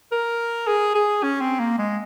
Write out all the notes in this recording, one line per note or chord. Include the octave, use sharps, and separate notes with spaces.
A#4
G#4
G#4
C#4
C4
A#3
G#3